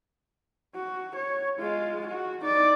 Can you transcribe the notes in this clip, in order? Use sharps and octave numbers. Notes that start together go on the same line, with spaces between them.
F#4
C#5
G#3 F4
F#4
D#4 D5